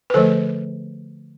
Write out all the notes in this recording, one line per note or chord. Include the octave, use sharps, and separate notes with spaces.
B4
D3 F3 A3 A4 C5